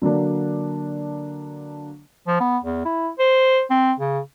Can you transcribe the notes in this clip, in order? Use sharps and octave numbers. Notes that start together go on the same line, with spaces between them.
D3 F#3 A#3 D4
F3
B3
E2
E4
C5
C4
C#3